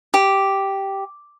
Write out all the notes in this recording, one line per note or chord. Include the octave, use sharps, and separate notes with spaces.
G4